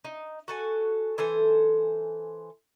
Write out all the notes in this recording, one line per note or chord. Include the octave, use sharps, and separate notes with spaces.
D#4
F#4 A4 G#5
E3 A4 C5 G#5